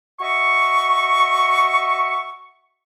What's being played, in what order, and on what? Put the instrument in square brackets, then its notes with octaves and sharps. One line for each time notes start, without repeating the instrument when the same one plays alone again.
[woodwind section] F#4 D#5 E5 C#6